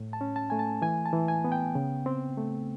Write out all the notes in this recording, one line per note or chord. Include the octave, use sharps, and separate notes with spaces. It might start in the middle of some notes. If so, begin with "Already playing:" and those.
Already playing: A2
A5
C#4
A5
A3 G#5
A5
E3 G#5
A5
E3
G#5
B3
G5
C#3
C4
A3